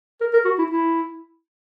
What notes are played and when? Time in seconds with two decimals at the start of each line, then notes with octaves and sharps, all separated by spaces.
0.21 A#4
0.34 A#4
0.45 F#4
0.59 E4
0.71 E4